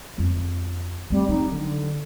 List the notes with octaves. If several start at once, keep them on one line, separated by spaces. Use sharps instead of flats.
F2 F4
G3 A3 C4
F#3 D#4
D3